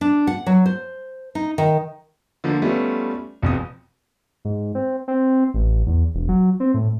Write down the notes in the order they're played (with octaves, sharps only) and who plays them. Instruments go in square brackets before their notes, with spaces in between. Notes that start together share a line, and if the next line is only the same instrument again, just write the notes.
[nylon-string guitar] D4
F#5
F#3
C5
D#4
D#3
[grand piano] D3 F3 A#3
G3 A3 B3 C#4 F4
E1 F2 D#6
[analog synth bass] G#2
C4
C4
A1
E2
E1
F#3
C4
A2